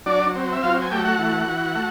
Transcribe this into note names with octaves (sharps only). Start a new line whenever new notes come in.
F#3 D4 D5
C4
E5
F#3 F4 F5
G#5
A3 G4 G5
F#4 F#5
E3
E3
A3